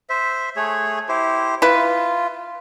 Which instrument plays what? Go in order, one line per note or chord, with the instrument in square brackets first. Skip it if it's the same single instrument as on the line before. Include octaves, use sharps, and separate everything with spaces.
[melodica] C5 E5
A3 G#4 C#5
E4 G4 C5
[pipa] E4 B4 [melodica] F4